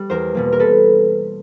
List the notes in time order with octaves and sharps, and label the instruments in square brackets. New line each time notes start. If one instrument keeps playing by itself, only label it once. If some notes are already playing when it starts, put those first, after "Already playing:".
Already playing: [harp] G3
E2 A#4 C5
B2 G3 A#3
A#4
A4 B4